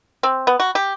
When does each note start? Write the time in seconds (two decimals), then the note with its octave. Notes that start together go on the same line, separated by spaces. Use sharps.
0.23 C4
0.47 B3
0.60 F#4
0.75 G4